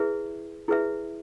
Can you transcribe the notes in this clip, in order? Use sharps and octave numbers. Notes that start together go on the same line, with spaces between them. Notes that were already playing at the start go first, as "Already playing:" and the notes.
Already playing: E4 G#4 B4 E5
E4 G#4 B4 E5